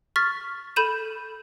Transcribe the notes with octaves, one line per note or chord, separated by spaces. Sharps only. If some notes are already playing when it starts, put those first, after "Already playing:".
C#6 F6 A6 B6
A4 B5 G6 D#7 E7